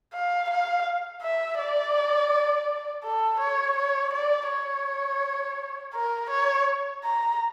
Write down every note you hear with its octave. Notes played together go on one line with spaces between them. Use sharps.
F5
F5
E5
D5
A4
C#5
C#5
D5
C#5
A#4
C#5
A#5